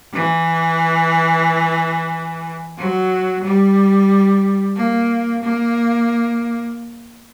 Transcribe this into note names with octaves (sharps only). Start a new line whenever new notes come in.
E3
F#3
G3
A#3
A#3